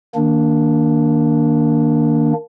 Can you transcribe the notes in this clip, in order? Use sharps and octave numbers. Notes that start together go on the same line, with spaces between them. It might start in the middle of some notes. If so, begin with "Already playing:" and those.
D#3 A#3 D4